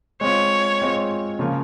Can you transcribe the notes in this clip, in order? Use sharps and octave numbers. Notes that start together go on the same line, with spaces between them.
G#3 C4 F4 C#5
G#3 C4 F4
C#3 F3 A#3 F4